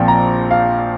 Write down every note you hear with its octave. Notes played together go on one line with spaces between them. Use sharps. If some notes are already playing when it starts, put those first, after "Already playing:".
Already playing: A#1 A#2 F3 C4 D5 G5
A#5
F5